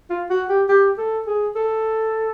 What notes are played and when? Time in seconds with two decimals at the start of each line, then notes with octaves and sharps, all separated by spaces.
0.10 F4
0.30 F#4
0.49 G4
0.69 G4
0.98 A4
1.27 G#4
1.56 A4